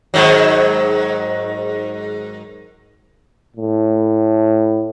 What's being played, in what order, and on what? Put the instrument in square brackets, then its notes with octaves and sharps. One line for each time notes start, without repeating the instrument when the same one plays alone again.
[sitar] G#2 D#3 F#3
[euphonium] A2